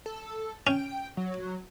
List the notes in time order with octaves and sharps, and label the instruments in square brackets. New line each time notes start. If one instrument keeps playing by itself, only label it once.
[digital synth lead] A4
[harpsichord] C#4 [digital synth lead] G5
[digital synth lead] F#3